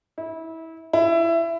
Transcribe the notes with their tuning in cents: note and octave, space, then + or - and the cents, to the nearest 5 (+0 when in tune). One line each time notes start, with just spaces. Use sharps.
E4 -25
E4 +20